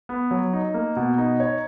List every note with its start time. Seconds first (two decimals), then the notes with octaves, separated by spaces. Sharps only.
0.09 B3
0.31 F#3
0.53 D#4
0.74 A#3
0.96 B2
1.18 D#4
1.40 C#5